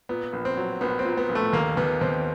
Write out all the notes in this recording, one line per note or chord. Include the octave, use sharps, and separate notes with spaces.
A#2 B3
A#1
C4
F#3
A#1 B3
C4
A#2
B3
A#1
A3
D#2 A#3
D#2 B3
D#2 C4